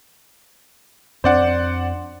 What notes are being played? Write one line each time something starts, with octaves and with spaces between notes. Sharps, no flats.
F2 C4 D4 C5 D5 F#5